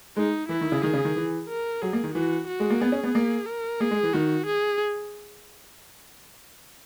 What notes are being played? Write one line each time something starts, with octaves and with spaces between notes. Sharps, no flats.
G#3 D#4
E3 E4
D#3
C#3
D#3 G#4
C#3
D#3
E3
A#4
F#3 G#4
A#3
D#3
E3 F#4
F#4
G#3
A#3
B3 G#4
C#4
B3
A#3
A#4
A#3 G#4
G#3
E3
D#3 F#4
G#4